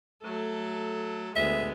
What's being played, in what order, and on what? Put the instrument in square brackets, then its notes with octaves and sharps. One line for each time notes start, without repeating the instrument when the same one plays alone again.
[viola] F#3 A4 [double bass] A3
[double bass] D2 [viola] G#3 B3 [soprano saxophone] E5